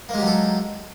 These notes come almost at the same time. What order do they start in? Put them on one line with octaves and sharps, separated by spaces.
A#3 G#3 G4 F#3 A4